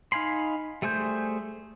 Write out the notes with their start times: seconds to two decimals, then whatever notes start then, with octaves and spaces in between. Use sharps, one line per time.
0.12 D#4 F5 G#5 B5 C6
0.82 G3 A3 G#4 C5 G6